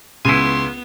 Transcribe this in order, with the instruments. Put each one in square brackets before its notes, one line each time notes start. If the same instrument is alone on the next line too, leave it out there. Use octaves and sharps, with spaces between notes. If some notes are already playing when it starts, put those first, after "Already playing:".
[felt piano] C#2 C7 [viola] B3 [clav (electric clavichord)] E4 G#5 [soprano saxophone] C6